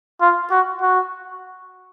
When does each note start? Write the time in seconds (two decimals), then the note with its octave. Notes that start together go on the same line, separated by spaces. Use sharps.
0.21 F4
0.51 F#4
0.81 F#4